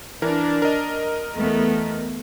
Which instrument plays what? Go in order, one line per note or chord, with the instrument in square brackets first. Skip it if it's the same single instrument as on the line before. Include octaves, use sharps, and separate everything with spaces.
[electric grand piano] E3 A#4 [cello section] D4
[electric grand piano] A#4 D#5
[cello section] E2 A3 B3